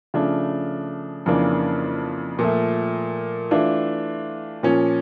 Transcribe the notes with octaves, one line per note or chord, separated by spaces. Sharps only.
C#3 F3 A3 D4
F2 C#3 E3 A#3 D4
A#2 F3 A3
E3 A3 D4 F4
A#2 F3 C#4